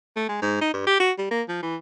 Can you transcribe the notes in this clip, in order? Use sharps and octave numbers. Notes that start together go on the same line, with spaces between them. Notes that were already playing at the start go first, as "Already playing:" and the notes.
A3
G#3
G#2
D#4
G2
G4
F#4
G3
A#3
F3
E3